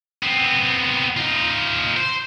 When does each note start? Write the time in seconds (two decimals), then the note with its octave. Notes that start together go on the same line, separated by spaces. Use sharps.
0.23 B3 C4
1.17 D#4 F4
1.97 C5